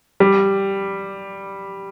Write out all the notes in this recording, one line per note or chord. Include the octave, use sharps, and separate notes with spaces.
G3